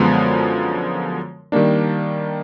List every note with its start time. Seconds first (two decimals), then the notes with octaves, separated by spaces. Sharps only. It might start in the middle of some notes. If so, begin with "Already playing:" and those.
Already playing: F#2 D3 F3 G#3 B3
1.52 D#3 G3 A#3 D4